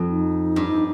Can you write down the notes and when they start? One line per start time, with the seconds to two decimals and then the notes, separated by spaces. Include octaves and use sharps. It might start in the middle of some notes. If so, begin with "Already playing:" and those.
Already playing: F2
0.08 D#4
0.56 G2